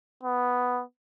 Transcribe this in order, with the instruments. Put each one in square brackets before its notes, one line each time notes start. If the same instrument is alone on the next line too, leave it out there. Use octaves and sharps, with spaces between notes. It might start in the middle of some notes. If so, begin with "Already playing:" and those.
[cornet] B3